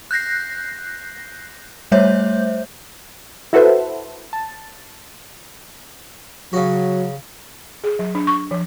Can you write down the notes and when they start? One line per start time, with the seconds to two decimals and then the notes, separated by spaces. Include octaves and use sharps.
0.11 F#6 G6 A#6 C7
1.92 G3 A3 C5 C#5 E5 G6
3.53 E4 F#4 A4 B4 C5 E5
4.33 A5
6.53 C#3 F#3 F#4
7.84 G#4
7.99 F#3
8.15 D4
8.27 C#6
8.51 F3